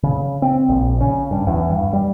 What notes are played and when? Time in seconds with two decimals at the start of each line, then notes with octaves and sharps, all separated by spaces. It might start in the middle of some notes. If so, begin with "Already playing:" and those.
0.03 C#3
0.42 C4
0.69 A#1
1.01 C#3
1.31 G2
1.47 E2
1.70 G2
1.93 G3